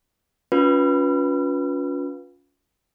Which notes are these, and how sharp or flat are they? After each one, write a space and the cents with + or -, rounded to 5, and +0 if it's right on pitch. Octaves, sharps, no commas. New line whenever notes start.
C#4 +30 F4 +30 B4 -15